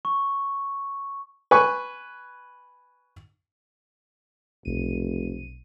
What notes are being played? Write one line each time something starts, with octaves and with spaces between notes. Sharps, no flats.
C#6
B4 G#5 C#6
F1 B1 D#7